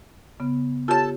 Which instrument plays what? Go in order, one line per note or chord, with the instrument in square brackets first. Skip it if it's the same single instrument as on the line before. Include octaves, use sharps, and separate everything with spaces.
[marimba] C#3 B3
[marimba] F4 G4 C#5 [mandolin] A4 A5